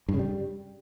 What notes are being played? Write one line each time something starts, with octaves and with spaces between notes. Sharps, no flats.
G2
C#3
G3